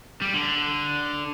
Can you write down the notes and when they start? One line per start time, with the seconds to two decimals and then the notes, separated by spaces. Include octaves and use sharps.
0.22 G3
0.34 D3